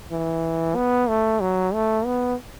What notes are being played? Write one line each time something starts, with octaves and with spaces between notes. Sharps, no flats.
E3
B3
A3
F#3
A3
B3